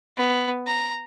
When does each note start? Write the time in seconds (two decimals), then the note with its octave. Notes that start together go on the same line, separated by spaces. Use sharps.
0.17 B3
0.67 A#5